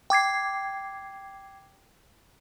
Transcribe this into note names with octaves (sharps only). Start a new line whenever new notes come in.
G5 D6 G#6 C7